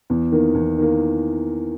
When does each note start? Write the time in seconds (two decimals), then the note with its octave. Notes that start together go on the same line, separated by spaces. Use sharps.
0.10 E2
0.32 D#3 A#3
0.55 E2
0.78 D#3 A#3